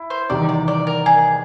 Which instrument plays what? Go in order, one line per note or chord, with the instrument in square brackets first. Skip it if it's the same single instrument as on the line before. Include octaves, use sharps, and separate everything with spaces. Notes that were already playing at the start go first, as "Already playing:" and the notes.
Already playing: [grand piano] E4
[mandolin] C5
[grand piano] E2 C3 D#3 G3 [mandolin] D5
[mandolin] D5
D5
A#4
G#4